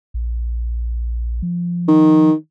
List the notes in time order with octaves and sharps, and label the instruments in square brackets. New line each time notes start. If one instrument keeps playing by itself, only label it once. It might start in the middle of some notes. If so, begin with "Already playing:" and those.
[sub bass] A#1
F3
[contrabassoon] D#3